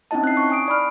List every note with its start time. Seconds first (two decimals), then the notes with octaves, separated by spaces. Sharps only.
0.11 C4 C#4 D#4 E4 D#5 A5
0.24 F#6 C7
0.37 C#6
0.50 G#5 D#6 D7
0.68 D5 B5 F6